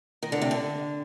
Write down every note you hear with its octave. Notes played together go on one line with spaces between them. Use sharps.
D#3
D3
C3
D3